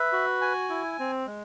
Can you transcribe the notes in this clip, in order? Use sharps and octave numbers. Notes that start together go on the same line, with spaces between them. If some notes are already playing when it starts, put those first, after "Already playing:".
Already playing: B4 E5
F#4
G#5
E4
C4
G#3